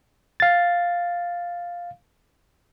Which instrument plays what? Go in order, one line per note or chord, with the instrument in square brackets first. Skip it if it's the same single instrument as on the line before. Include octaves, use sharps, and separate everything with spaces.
[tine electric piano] F5 A6